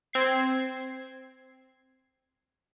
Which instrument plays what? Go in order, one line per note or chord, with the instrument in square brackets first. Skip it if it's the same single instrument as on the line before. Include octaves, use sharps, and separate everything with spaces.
[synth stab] C4 G#6 C7